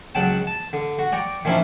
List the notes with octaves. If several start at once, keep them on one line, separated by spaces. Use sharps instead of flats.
C#2 F#3 F#5 G5 A5
A5
D3
F#4
D5 G5 A#5 C#6
D#3 F3 C#4 D4 E4